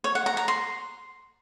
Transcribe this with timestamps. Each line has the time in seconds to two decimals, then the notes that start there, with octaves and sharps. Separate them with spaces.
0.04 C#5
0.15 F#5
0.26 A#5
0.37 A#5
0.48 C6